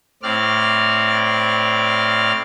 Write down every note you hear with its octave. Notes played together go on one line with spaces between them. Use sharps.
A2 C4 D5 F6